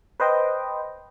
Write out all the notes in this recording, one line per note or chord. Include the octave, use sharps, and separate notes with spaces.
B4 C5 D#5 G5